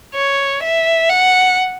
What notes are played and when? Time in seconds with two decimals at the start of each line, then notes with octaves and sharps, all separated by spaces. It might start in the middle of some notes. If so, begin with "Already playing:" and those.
0.15 C#5
0.63 E5
1.09 F#5